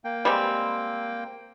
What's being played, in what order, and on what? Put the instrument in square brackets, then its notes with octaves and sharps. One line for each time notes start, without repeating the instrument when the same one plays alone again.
[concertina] A#3 G5
[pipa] G3 G#3 C4